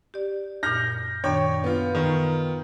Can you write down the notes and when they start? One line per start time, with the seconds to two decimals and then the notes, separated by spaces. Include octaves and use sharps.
0.14 G4 D5
0.63 F#2 A#2 F6 G6 A#6
1.24 F#2 A#2 D#3 D4 C#5 G5
1.64 B3 F4
1.95 D#3 C#6